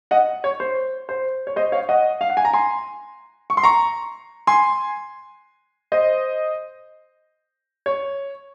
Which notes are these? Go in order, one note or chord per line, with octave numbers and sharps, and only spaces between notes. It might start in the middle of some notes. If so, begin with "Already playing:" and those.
D#5 F#5
C#5
C5
C5
C#5
C5 D#5
C#5 F5
D#5 F#5
F5
F#5
G#5
A#5
G#5 C6
C#6
C6
A#5 C#6
G#5 C6
C5 D#5
C#5